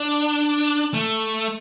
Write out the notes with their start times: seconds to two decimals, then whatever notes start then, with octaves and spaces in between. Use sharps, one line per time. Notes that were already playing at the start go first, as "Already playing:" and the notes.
Already playing: D4
0.94 A3